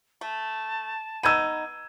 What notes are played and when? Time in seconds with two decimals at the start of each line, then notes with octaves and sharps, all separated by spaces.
0.21 A3 A5
1.23 B3 D#4 E6 G#6 D#7